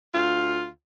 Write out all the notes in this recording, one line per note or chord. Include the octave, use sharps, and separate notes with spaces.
D2 F4